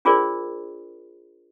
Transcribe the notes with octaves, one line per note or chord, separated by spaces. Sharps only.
D4 F4 G#4 A#4 C5 D5